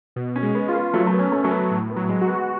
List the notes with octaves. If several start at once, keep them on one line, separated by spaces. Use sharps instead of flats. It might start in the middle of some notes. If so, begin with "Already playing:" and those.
B2
C#4
G#3
B3
F4
B3
F#3 A3
A3
B3
C#4
A3
F#3 A3
B3
A2
B3
F#3
G#3
F#4
B3